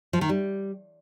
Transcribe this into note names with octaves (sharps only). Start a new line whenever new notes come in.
F3
D#3
G3